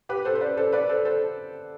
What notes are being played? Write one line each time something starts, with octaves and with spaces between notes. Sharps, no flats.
G4 B4
A4 C5
C5
B4 D5
A4 C5
B4 D5
A4 C5
A4 C5